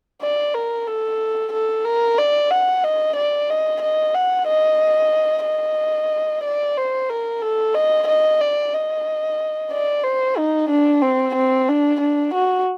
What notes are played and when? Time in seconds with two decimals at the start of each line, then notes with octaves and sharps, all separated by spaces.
0.22 D5
0.54 A#4
0.87 A4
1.53 A4
1.85 A#4
2.18 D5
2.51 F#5
2.84 D#5
3.16 D5
3.50 D#5
3.82 D#5
4.15 F#5
4.48 D#5
5.45 D#5
6.44 D5
6.77 C5
7.09 A#4
7.42 A4
7.75 D#5
8.08 D#5
8.40 D5
8.74 D#5
9.72 D5
10.04 C5
10.38 D#4
10.70 D4
11.02 C4
11.35 C4
11.69 D4
12.01 D4
12.34 F#4